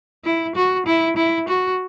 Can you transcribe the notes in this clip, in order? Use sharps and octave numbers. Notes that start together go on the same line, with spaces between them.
E4
F#4
E4
E4
F#4